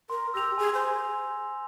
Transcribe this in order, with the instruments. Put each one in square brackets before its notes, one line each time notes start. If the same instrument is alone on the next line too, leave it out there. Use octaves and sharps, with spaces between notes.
[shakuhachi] A#4 [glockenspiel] C6
[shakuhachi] G4 [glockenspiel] E6 A#6 F7
[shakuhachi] G#4 [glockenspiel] G#5
[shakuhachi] C5